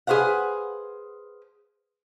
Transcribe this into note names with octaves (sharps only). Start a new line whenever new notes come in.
G#4 B4 C5 F5 F#5